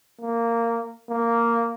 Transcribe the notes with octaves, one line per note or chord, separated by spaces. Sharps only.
A#3
A#3